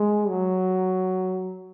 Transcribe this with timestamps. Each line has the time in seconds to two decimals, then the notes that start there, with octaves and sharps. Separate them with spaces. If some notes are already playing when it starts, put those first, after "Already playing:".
Already playing: G#3
0.29 F#3